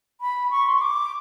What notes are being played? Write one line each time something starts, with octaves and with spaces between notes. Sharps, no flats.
B5
C#6
C6
C#6
D6